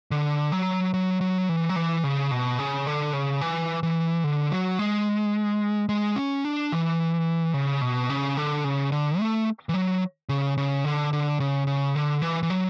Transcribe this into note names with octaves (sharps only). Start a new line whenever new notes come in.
D3
F#3
F#3
F#3
E3
F#3
E3
C#3
B2
C#3
D3
C#3
E3
E3
D3
F#3
G#3
G#3
C#4
D4
E3
C#3
B2
C#3
D3
C#3
D3
A3
E3
F#3
C#3
C#3
D3
D3
C#3
C#3
D3
E3
E3
F#3